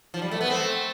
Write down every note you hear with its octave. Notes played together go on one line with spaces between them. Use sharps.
F3
G3
A3
B3
A3 C4